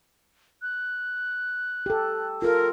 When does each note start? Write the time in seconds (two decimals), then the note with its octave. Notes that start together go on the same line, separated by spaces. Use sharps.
0.62 F#6
1.86 G4 A4
2.42 F4 A4 A#4